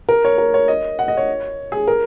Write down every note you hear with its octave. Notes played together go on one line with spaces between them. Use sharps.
A#4
C#5
A#4
C#5
D#5
F#5
D#5
C#5
G#4
A#4